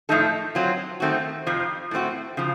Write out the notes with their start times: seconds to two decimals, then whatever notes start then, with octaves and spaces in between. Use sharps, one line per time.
0.09 A2 F3 A3 D#4 A4
0.55 F#3 C4 F4
1.00 D#3 A3 C4 F#4
1.47 F2 C3 F3
1.91 A2 A3 C4 F#4
2.37 C#3 F3